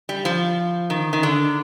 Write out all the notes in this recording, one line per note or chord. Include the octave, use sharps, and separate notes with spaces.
G3
F3
D#3
D#3
D3